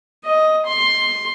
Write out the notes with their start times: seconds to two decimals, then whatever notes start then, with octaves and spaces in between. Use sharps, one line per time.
0.25 D#5
0.66 C6